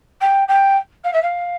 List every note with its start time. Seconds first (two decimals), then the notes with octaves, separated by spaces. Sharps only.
0.21 G5
0.48 G5
1.04 F5
1.13 E5
1.22 F5